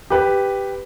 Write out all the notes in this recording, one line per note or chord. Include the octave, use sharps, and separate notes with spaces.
G4 B4